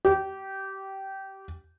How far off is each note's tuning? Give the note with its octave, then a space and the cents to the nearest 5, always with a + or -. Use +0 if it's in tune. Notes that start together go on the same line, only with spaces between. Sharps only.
G4 -20